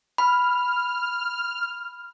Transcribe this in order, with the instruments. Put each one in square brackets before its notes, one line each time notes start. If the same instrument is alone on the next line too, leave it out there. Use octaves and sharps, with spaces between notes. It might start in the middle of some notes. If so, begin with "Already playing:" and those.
[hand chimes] B5 [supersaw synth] F6